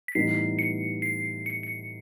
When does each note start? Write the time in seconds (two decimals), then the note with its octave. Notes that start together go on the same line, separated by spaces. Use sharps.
0.08 B6
0.15 A2 E3 G3 B3 D#4 C7
0.59 C#7
1.02 C7
1.46 C#7
1.63 C#7